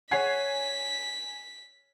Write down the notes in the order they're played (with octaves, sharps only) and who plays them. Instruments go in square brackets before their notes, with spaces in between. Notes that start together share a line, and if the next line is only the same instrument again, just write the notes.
[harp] C#5 F#5 [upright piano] G#5 G#6 C7 [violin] B6